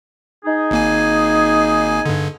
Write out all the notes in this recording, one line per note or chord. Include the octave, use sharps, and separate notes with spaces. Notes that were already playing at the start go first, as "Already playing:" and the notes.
D#4 G#4
G#1 A#3 G#5
G2 D3